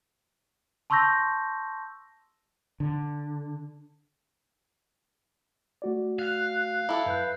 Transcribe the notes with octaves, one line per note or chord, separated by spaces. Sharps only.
A5 C6 C#6 E6 G6 A#6
D3
A3 F#4 D5
F5 F#6
E4 A4
F#2 B4 F#6 G6